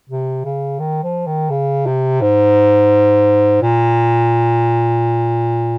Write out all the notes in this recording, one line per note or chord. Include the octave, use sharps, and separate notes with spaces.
C3
C#3
D#3
F3
D#3
C#3
C3
G#2
A#2